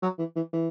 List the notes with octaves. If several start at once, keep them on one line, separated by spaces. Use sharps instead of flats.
F#3
E3
E3
E3